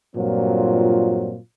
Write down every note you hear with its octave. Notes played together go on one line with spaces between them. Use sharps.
G2 A#2 F#3 C4 F4